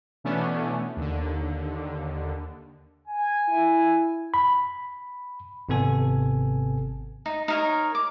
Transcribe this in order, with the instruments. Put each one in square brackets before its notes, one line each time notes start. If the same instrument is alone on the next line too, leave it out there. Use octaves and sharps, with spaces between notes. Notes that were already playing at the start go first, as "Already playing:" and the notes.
[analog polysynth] B2 E3 A3 B3 C#4 D4
D#2 D3
[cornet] G#5
[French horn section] E4
[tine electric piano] B5
G#1 C3 B3 A4 G#5
[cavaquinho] D#4
D#4 A#4 C#5
D6